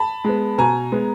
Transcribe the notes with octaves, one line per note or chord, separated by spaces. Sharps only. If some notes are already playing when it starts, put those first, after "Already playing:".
Already playing: A5 B5
G#3 B3
B2 G#5 A#5
G#3 B3